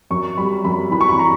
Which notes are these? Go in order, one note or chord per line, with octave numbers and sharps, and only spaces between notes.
F#2 C#6
G3 B5
F#2 B5
E3 B5
C#6
B5
A#5